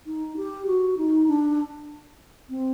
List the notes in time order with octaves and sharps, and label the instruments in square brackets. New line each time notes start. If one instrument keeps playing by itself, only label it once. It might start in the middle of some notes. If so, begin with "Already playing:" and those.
[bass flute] D#4
G4
F#4
D#4
D4
C4